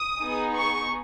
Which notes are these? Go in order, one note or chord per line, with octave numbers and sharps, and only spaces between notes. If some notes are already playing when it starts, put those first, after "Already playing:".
Already playing: D#6
B3 D#4 G#4
C#6